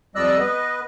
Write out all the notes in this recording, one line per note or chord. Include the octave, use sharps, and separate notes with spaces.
F2 G3 D5 D#5 E6 F#6
B3 B4 D#5